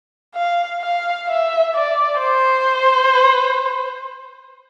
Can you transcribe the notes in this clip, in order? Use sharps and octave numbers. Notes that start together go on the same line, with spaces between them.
F5
F5
E5
D5
C5